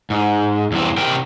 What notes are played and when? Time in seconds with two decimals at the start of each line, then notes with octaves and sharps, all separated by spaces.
0.10 G#2
0.72 E2 G2 C4
0.97 C3 A#4 G5